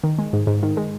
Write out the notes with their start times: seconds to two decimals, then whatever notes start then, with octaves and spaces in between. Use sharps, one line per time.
0.04 D#3
0.18 G#3
0.33 G#2
0.47 G#2
0.63 D#3
0.77 G#3